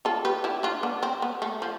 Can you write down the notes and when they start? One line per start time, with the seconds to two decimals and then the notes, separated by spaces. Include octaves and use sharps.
0.05 F4 A4
0.25 G4 B4
0.44 E4 G4
0.63 D4 F4
0.83 B3 D4
1.03 C4
1.22 B3
1.42 A3
1.62 F3